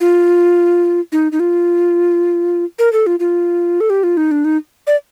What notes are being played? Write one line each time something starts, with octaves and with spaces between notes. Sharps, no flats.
F4
D#4
D#4
F4
A#4
A4
F4
F4
A4
G4
F4
D#4
D4
D#4
D5